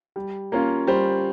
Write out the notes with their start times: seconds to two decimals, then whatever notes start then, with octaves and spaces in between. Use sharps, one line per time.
0.16 G3
0.52 A#3 C#4 F4
0.87 G3 C5